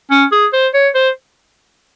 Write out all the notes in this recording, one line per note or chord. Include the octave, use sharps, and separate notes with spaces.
C#4
G#4
C5
C#5
C5